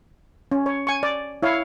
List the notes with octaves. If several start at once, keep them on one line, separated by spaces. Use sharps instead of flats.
C#4
C#5
G#5 C#6
D5
E4 C#5 F5